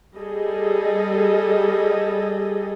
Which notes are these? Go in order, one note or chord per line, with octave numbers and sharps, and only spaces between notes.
G3 G#4 A4 D#5